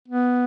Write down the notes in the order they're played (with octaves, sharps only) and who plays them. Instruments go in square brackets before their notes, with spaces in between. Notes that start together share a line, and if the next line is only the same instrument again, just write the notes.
[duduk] B3